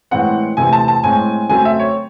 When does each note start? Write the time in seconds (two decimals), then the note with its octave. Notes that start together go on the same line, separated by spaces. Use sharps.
0.11 A2 E3 G#3 C4 F#5
0.57 C3 E3 A3 C4 G#5
0.73 A5
0.88 A5
1.04 A2 G#3 C4 G#5
1.49 C#3 F#3 A3 C4 G#5
1.65 E5
1.79 C#5